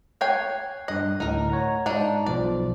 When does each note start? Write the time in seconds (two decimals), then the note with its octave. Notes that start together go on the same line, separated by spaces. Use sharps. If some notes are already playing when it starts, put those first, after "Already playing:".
0.21 C#5 G5 G#5 F#6 G#6 C7
0.88 G2 D#5 F#6
1.20 D2 A2 D#4 A#4
1.50 C#5 F#5 A#5
1.86 G#2 D4 D#4
2.26 B1 F3 D5